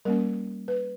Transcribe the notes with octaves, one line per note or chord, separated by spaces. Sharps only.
G3 A#3 C#4 A#4
B4